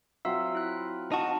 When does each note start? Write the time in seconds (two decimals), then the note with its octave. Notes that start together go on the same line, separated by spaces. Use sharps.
0.25 F#3 C4 F4 E5 F5 E6
0.55 E4 F#6
1.12 D#4 F#4 A5